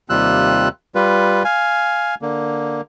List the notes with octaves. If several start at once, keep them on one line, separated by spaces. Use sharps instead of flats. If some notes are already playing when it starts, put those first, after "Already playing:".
D#2 C3 G3 F4 E6 F#6
G3 F4 B4
F5 G#5
D3 A#3